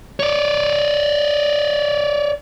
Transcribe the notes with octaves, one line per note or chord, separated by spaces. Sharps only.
C#5 D5